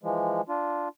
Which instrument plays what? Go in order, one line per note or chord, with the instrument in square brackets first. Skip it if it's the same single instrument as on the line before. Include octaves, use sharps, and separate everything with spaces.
[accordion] E3 F3 G#3
D4 F4